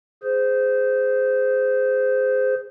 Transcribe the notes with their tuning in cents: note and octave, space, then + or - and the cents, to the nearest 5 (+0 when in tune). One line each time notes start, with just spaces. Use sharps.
G#4 +0 C5 -15